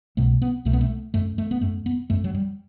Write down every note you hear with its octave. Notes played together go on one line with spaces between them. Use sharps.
C2 B2 A3
B3
C2 B2 A3
B3
A3
F#2 A3
A3
B3
F#2 A3
B3
F#2 A3
F#3
G3